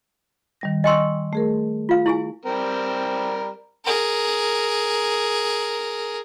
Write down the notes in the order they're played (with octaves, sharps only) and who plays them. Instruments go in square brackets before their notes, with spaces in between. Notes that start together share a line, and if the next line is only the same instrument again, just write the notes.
[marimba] D#3 G3 A#6
[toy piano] D#5 G5 C6 [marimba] G#5 C#6 E6
[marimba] A3 G#4 A#4
[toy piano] F4 F5
E4 G#4 G#5
[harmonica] G3 C4 A#4
[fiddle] G#4 A#4